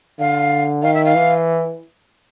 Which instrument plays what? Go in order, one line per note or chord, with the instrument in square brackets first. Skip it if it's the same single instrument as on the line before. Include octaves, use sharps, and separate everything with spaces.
[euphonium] D3 [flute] F5
[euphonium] D#3 [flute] F5
[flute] E5
F5
[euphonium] E3